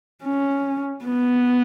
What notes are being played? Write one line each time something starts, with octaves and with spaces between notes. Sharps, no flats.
C#4
B3